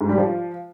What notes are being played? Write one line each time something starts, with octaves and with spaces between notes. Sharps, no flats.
G#2
G3
F3